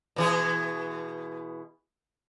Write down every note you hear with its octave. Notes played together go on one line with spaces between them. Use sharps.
B2 E3 G#4